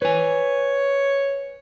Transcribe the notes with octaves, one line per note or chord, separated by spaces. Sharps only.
B4 C#5 G#5